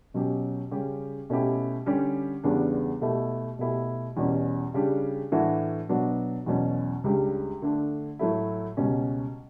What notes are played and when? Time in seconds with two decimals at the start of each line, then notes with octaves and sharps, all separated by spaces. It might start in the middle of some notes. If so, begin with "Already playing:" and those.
0.14 B2 F#3 C#4 G4
0.71 C#3 G3 C#4 G4
1.30 B2 A3 C#4 E4 G4
1.86 D3 G3 C#4 G4
2.44 E2 C#3 G3 B3 D4
3.01 B2 A3 E4 G4
3.59 B2 A3 E4 G4
4.17 E2 B2 G3 C#4
4.74 C#3 G3 D4 G4
5.32 A2 E3 A3 D4 F#4
5.89 B2 F#3 B3 D4 F#4
6.46 E2 B2 F#3 C#4
7.04 C#2 C#3 G3 D4 G4
7.62 D3 A3 D4
8.19 A2 F#3 A3 E4
8.77 C#2 B2 G3 C#4